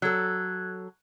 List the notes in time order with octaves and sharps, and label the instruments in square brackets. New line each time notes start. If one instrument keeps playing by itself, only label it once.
[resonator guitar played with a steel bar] F#3 A4 [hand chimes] F#6 G#6